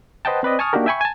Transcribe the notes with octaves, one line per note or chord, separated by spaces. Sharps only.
B4 C5 D#5 F#5 G5 A5
C4 B4 D5 D#5
G#5 A5 C#6 D#6 F6
A#3 D4 D#4 F#4 G4 A#4
E5 G5 G#5 B5 C#6
G#5 A5